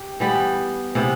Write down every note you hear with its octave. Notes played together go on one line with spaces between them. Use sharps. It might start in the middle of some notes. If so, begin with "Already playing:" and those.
Already playing: G4
E3 G3 B3
C3 E3 B3